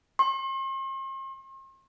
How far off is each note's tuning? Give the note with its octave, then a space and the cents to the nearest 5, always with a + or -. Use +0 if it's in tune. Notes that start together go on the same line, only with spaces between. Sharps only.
C6 +45